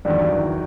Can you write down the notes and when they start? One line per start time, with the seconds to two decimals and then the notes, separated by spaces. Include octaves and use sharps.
0.05 E2 G2 D#3 F#3 G3
0.30 E3